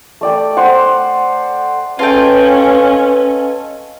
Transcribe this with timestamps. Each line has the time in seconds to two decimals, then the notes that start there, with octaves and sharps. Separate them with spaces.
0.21 A3 D5 G5
0.57 C5 F#5
1.99 C#4 F4 A4 B4 D#5 G5